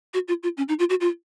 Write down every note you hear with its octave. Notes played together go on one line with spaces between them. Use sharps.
F#4
F4
F4
C#4
D#4
F4
F#4
F4